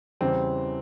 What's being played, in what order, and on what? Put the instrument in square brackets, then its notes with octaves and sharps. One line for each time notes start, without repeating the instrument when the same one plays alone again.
[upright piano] E2 C#3 E3 G3 C4